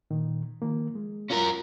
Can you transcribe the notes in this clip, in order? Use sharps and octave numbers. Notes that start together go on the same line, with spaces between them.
A#2 D#3
D#3 F3 A#3
G#3
C#4 F4 A#4